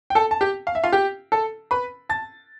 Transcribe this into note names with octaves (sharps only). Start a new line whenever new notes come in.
G5
A4 A5
A5
G4 G5
F5
E5
F4 F5
G4 G5
A4 A5
B4 B5
A5 A6